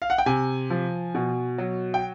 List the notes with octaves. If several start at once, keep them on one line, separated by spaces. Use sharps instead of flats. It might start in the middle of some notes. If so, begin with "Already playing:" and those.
F5
F#5
G5
C3 G#5
F3
B2
F#3
G5